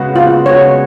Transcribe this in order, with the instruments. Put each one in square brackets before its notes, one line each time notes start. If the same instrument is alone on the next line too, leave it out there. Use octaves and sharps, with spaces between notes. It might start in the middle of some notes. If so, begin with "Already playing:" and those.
Already playing: [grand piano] C#3 G#3 B3 F#4
[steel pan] F4
[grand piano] C#3 G#3 B3 F#4 [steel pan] C#5